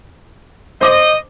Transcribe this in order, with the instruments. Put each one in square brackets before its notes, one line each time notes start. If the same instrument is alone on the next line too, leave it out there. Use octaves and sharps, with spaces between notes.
[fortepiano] C5 D6 [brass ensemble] D#5